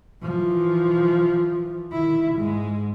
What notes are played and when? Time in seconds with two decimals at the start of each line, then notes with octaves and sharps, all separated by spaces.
0.22 E3 F3
1.92 D#3 E4
2.36 G#2 G#3